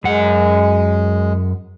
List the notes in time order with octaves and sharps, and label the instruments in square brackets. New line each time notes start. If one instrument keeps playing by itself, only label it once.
[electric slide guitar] F#2 F#5 [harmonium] G#3